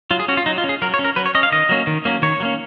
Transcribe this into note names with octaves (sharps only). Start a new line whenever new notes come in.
F#3 F4
G#4
C#4 F#4
F4
F#3 D#4
F4
C#4
G#4
F#3 A#4
C#5
C#4
A#4
F#3 B4
C#5
C#4 D#5
F5
D#3 D#5
F#3 A#3 C#4
D#3
F#3 A#3 C#4
D#3 C#5
F#3 A#3 C#4